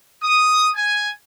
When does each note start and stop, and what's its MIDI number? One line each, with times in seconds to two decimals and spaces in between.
0.23 0.69 87
0.76 1.11 80